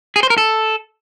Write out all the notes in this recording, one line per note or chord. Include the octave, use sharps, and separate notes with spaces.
G#4
C5
A#4
A4